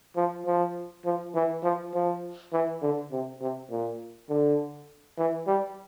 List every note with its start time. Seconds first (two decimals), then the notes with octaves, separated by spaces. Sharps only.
0.16 F3
0.46 F3
1.05 F3
1.35 E3
1.64 F3
1.94 F3
2.53 E3
2.82 D3
3.12 C3
3.41 C3
3.70 A#2
4.30 D3
5.18 E3
5.47 G3